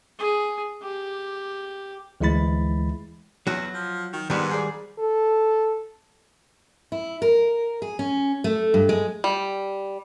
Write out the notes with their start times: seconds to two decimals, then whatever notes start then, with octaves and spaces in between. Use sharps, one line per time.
0.19 G#4
0.82 G4
2.21 D2 E3 G#3 E4 B5 A6
3.47 E2 F#3 F#4
3.74 F3
4.13 D#3
4.30 G#2 D#3 G3 B3
4.51 G#4 D5
4.99 A4
6.92 E4
7.22 A#4
7.82 G#4
7.99 C#4
8.44 A3
8.74 G2
8.89 G#3
9.24 G3